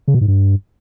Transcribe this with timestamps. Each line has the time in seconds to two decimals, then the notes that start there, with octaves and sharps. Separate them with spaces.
0.08 C#3
0.14 B2
0.21 G#2
0.28 G2